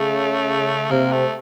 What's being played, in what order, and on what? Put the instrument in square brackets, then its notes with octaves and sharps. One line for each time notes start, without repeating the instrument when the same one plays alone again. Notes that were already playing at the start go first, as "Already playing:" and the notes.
Already playing: [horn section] C#3 [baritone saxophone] A3
[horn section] C3 [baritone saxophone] A#3
[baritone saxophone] A3